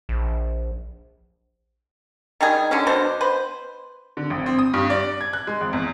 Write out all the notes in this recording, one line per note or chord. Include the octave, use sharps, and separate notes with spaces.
A#1
D#3 G3 G#4
D3 F#3 C#4
B2 D4 C5
B4 C5
D3
G#1
C4
D#6
G2
D5
G#6
F#6
G#3
G#1
E2